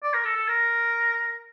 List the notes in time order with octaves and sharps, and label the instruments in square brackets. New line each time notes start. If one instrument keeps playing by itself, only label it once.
[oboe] D5
A#4
A4
A4
A#4